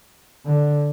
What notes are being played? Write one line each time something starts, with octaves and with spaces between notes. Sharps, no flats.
D3